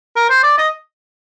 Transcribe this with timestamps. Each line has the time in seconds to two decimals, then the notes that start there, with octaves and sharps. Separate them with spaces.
0.16 A#4
0.29 C5
0.43 D5
0.58 D#5